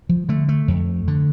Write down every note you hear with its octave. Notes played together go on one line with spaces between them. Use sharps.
F3
D3 A3
A3
F2
D3